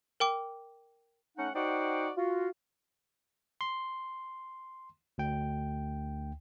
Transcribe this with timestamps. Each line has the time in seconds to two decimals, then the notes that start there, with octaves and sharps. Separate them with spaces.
0.20 A#4 G5 D6
1.38 A3 C#4 D#4 F#5
1.55 D#4 F#4 C5 D5 F#5 G5
2.17 F4 F#4
3.61 C6
5.18 D2 G5